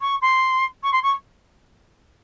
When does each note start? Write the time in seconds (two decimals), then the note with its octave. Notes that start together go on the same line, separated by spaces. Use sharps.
0.01 C#6
0.21 C6
0.83 C#6
0.92 C6
1.03 C#6